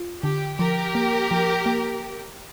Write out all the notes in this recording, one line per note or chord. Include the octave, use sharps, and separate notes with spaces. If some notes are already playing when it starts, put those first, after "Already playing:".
Already playing: F4
D3 G4
F3 G4 A#4
A#3
F3
A#3